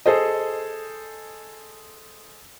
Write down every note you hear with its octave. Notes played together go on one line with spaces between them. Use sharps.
G#4 A4 C5 D#5